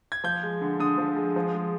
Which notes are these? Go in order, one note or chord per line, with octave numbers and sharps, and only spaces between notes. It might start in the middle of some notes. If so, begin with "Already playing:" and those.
G#6
F3 G6
G#3
D3
D3 D#6
F3
G#3
F3
G#3